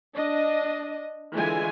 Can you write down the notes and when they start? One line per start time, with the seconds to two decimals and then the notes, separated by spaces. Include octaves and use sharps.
0.14 D4 D#5
1.35 D3 E3 G#3 E4 F4 G#5